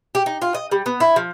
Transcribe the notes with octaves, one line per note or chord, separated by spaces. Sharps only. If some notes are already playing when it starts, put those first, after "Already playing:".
G4
D#4
F4
D#5
G3
B3
E4
F3